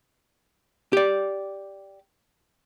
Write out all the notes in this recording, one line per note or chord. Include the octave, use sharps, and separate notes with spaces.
G4 D5